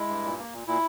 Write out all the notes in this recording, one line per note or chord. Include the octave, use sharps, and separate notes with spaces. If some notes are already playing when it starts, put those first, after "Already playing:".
Already playing: G#3 E4
G2
A#2
A#3
A#2
A#2 E4